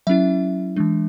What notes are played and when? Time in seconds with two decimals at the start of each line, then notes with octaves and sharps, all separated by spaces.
0.07 F#3 C#4 E4 E5
0.76 E3 G#3 D4